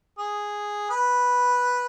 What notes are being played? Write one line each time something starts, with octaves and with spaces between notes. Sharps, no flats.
G#4
B4